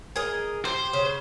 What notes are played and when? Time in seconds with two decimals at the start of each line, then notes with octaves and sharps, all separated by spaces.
0.16 G#4 A#4 D#5
0.65 G4 C5
0.93 C#3